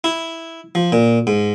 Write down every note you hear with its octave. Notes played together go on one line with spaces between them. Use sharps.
E4
F3
A#2
G#2